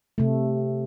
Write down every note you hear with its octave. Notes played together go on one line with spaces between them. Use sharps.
C3 A3